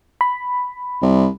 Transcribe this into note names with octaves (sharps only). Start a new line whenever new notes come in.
B5
C2